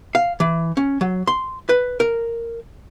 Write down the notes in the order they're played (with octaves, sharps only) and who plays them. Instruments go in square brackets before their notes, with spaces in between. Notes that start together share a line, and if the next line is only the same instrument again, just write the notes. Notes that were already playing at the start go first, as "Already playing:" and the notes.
[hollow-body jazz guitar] F5
E3
C#4
F#3
C6
B4
A#4